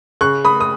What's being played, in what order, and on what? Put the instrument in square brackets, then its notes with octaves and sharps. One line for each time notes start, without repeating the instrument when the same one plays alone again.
[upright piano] C#3 C#6 F#6
B5 D#6
D#6